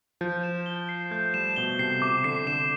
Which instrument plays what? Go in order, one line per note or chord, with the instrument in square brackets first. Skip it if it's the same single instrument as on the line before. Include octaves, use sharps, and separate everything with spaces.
[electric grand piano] F3 [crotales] G6
[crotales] E7
G7
C7
[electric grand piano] A3 [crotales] G6
[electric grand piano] G3 [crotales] E7
[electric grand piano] B2 [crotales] G7
[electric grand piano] C3 [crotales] C7
[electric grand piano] C3 [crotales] D6
[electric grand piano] D3 [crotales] C7
[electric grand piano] D3 [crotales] E7